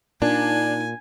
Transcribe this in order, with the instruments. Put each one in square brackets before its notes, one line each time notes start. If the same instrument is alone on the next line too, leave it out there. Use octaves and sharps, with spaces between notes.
[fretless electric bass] A#2 [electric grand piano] D4 [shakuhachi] D#4 [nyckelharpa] G#5